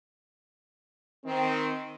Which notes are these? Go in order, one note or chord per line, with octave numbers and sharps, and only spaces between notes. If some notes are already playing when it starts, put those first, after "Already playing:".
D#3 C4